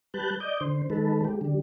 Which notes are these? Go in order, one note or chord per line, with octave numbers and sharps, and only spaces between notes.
G3 B4 A5 F#6 G6
D5 D#5 G6
D3 C5
D#3 G#3 A4 B4
G#3 G4
D3 G3